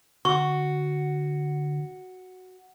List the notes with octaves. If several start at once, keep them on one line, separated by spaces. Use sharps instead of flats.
D3 F#4 C#6